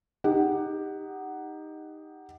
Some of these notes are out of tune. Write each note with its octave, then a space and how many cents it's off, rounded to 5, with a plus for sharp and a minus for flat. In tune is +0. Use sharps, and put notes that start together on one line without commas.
D#4 +0 G4 +15 F#5 +10